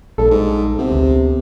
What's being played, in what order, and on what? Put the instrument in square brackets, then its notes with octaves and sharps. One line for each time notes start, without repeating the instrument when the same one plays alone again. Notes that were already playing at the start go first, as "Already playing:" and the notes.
[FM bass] A#1 [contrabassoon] G2 [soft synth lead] A4
[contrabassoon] G#2
[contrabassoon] C3 [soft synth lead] B3
[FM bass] D2